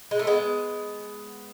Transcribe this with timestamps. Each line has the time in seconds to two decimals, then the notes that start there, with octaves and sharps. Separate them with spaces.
0.11 G#3
0.19 A3
0.27 G#3 B3